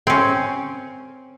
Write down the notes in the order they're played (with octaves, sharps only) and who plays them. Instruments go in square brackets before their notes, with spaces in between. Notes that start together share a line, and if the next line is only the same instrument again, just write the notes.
[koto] C4 C#4